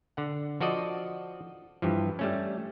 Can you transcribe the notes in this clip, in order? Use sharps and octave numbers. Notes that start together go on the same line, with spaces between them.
D3 F#5
F3 F#4 A4 D5 D#5
G2 E3 F3
G3 A3 C#4